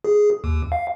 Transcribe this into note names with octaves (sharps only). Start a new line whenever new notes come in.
G#4
D#2
F5